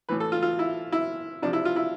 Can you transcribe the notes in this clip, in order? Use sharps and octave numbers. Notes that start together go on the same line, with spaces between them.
A2 E3 B4
A4
F4
F4
E4
E4
C3 F3 D4
E4
F4
E4